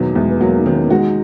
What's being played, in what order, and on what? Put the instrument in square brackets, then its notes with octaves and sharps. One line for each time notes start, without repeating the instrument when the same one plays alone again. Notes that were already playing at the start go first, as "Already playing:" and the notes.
Already playing: [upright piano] E2 D#3 F#3 [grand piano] B2
[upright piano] E2 [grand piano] G#3
[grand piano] B3
[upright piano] F#3 [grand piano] A#3
[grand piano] D#4
[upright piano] D#3 [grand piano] C#4
[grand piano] B3
A#3
[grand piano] G#3 [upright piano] F#4